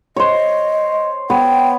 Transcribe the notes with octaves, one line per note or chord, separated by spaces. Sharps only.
C5 C#5 D#5
B3 C#5 G5